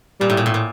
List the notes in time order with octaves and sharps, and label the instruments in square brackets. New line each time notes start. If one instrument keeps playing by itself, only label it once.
[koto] A#2 [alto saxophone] G3
[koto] A2
A#2
A2
A#2